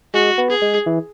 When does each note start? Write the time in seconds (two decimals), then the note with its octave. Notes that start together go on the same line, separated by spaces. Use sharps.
0.14 G#3 F#4
0.38 B3
0.50 G#4
0.62 G#3
0.86 E3